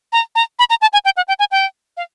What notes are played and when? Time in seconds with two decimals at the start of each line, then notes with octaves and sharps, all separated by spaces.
0.13 A#5
0.35 A#5
0.59 B5
0.70 A#5
0.82 A5
0.93 G#5
1.05 G5
1.17 F#5
1.28 G5
1.39 G#5
1.51 G5
1.97 F5